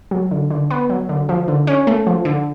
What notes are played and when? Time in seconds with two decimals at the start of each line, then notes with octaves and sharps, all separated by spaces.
0.11 F#3
0.31 D3
0.50 D3
0.70 B3
0.89 F#3
1.09 D3
1.29 F3
1.48 D3
1.67 C#4
1.87 A3
2.07 F3
2.25 D3